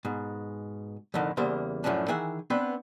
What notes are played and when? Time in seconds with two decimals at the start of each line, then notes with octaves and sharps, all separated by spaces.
0.05 G#2 B2
1.14 F2 A2 D3 D#3
1.37 E2 C#3 G3 A#3 C5 E5
1.84 F#2 A2 F3 C#4 D4
2.08 D#3 E3 G#4 E5 F#5
2.50 B3 C4 D4 B4